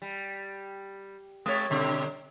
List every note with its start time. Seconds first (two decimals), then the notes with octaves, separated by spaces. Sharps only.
0.02 G3
1.46 G#3 C#5
1.70 B2 D3 G3